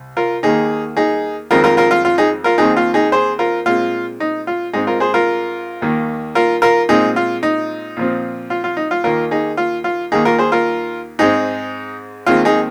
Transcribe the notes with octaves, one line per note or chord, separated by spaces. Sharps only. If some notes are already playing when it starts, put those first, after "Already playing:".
Already playing: C2
F4 A#4
D#2 D#3 A#3 D#4 G#4
D#4 G#4
F2 D#3 G#3 C4 F4 A#4
F4 A#4
F4 A#4
F4
F4
D#4 G#4
F4 A#4
D#2 D#3 C4 D#4 G#4
F4
D#4 G#4
G#4 C5
F4 A#4
A#2 G#3 C4 F4
D#4
F4
G#2 G#3 C4 D#4 G#4
F4 A#4
G#4 C5
F4 A#4
D#2 D#3 A#3
F4 A#4
F4 A#4
A#2 G#3 C4 D#4 G#4
F4
D#4
A#2 F3 C4
F4
F4
D#4
F4
D#2 D#3 A#3 F4 A#4
D#4 G#4
F4
F4
D#2 D#3 A#3 D#4 G#4
F4 A#4
G#4 C5
F4 A#4
G#2 G#3 C4 D#4 G#4
D#2 D#3 G#3 C4 F4
D#4 G#4